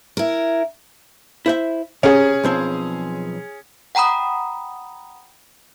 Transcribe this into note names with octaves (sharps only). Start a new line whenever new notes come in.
E4 A#4
E4 C5 E5
C3 C#4 G#4
B1 F3 C4
F#5 G5 A#5 B5 D#6